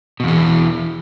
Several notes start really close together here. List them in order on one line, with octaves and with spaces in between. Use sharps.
B2 E2 E3